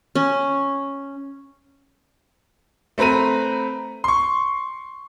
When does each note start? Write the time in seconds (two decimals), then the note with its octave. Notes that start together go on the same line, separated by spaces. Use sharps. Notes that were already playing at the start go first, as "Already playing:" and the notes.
0.15 C#4
2.98 A3 C4 B4 A#5 D#7
4.04 C6 C#6